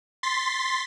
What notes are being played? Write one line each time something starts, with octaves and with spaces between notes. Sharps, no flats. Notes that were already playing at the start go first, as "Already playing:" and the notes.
C6 A6 B6